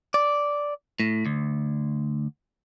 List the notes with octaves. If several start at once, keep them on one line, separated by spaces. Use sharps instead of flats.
D5
A2
D2